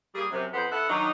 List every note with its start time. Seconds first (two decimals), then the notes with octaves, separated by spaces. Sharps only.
0.14 G3 A#3 G#4
0.31 F#2 C3
0.53 F2 B3 G#4 C5
0.71 B3 E4 A4 F#5
0.89 D#3 F#3 D4 D#4